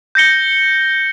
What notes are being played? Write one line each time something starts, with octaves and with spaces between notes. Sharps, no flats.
G6 A#6 C#7 G7